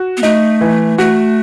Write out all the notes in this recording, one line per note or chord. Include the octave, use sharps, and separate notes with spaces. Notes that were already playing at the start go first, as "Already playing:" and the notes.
Already playing: F#4
B3
A3 D#4
E3
A3 F#4